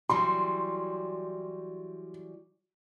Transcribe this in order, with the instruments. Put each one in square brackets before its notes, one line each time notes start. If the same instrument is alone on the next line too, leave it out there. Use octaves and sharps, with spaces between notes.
[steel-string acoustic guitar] E3 F#3 G3 [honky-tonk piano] C6